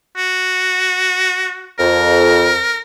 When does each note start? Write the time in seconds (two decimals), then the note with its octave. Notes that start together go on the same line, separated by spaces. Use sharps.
0.17 F#4
1.79 F2 A#4